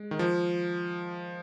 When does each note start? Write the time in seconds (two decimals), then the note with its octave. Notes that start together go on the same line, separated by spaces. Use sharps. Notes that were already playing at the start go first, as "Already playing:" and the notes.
Already playing: G#3
0.11 D#3
0.19 F3